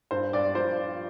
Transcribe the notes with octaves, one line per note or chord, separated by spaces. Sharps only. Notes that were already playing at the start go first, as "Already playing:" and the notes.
G2 C5
G2 D5
F3 C5
F3